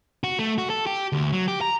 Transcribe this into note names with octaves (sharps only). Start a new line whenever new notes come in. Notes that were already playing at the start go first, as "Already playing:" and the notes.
F#4
A3
F#4
A4
G4
D2
F#3
G4
A#5